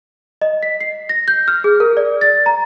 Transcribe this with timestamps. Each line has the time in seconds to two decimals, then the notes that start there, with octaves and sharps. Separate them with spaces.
0.41 D#5
0.63 B6
0.80 C7
1.09 A#6
1.28 G6
1.48 F6
1.64 G#4
1.80 A#4
1.97 D5
2.21 A6
2.46 A#5